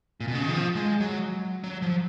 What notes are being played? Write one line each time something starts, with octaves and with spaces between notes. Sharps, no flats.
A#2
B2
C#3
D#3
F3
G#3
F#3
F#3
F3